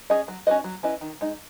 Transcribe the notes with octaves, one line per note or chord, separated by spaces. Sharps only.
C#4 G#4 D#5
F#3
C#4 F#4 B4 D#5
F#3
C#4 E4 B4 D#5
D#3
G#3 D#4